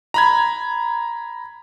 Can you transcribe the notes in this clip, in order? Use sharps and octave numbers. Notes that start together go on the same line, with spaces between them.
A#5 B5 G#6